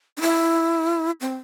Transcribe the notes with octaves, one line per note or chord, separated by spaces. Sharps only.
D4
E4
C4